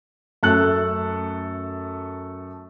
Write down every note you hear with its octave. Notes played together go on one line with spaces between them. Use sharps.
F#2 A3 A4 A5 F#6